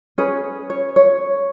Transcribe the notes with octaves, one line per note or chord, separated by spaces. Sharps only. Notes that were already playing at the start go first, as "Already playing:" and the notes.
C#4 G#4 B4 C#5
C#5
C#5